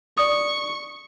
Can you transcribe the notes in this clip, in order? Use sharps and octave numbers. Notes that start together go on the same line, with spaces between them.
D5 C#6 D#6